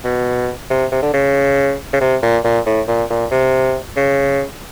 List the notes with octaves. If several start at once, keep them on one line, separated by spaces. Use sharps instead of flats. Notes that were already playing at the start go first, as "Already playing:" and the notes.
B2
C3
C3
D3
C#3
C#3
C3
A#2
A#2
A2
A#2
A#2
C3
C#3